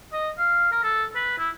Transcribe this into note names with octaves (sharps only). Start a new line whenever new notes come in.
D#5
F5
A#4
A4
B4
E4